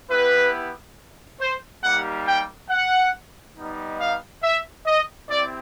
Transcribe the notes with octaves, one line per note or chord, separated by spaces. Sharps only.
B3 E4 G4 B4
C5
G3 A#3 D#4 G4 F#5
G5
F#5
G3 B3 D#4
F5
E5
D#5
C4 E4 G4 D5